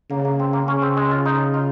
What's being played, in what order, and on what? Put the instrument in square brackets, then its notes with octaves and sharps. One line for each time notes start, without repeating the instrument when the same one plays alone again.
[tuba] C#3 [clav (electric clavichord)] A#3
[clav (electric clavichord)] A#3
C4
A#3
[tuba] C#3 [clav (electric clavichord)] C#4
[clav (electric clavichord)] C4
G#3
F4
D#4
F4